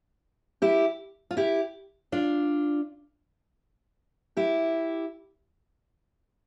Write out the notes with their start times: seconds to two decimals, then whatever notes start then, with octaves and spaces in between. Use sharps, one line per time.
0.62 E4 G4
1.31 F4
1.37 E4 G4
2.12 D4 F4
4.37 E4 G4